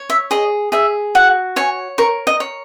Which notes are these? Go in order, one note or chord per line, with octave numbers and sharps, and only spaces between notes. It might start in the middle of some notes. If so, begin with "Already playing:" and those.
Already playing: C#5
E5
G#4 D#5
G#4 E5
F#4 F#5
C#5 G#5
A#4 C#6
D#5
C#5